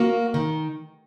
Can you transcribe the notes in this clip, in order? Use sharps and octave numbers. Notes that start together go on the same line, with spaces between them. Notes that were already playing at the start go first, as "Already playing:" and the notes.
Already playing: A#3 F#4
D#3